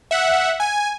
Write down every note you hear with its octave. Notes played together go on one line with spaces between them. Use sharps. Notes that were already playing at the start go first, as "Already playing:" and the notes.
E5 F#5
G#5